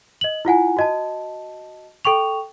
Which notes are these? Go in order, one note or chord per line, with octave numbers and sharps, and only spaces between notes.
D#5 F#7
E4 F4 F#5 G#5
F#4 D#5 A5
A4 G5 C#6 F7